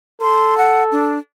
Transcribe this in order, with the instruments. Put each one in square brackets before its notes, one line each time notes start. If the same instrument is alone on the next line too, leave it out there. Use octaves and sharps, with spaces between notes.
[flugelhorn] A4 [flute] C6
[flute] F#5
D4